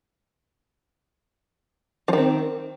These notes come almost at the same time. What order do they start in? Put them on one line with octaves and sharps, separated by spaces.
F3 D#3 C4